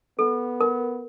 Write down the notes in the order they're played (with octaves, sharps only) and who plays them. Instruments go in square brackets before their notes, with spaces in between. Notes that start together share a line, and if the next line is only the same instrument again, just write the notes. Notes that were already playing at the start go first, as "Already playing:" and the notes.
[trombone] B3 [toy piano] A4
[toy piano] A#4